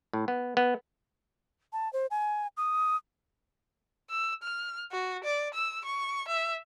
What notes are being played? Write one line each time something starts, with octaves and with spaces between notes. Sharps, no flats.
A2
B3
B3
A5
C5
G#5
D#6
E6
F6
F#4
D5
E6
C#6
E5